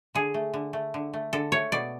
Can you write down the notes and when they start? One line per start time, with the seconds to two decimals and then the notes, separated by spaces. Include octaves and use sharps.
0.15 D3 G#4
0.34 A3
0.54 D3
0.73 A3
0.94 D3
1.13 A3
1.33 D3 A4
1.52 A3 C#5
1.72 B2 D5